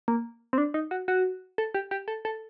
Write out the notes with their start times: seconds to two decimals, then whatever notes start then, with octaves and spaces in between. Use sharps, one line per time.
0.08 A#3
0.53 C4
0.58 D4
0.74 D#4
0.91 F#4
1.08 F#4
1.58 A4
1.74 G4
1.91 G4
2.08 A4
2.25 A4